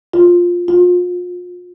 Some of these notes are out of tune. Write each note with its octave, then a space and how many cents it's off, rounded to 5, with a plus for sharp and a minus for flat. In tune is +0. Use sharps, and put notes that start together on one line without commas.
F4 +10
F4 +35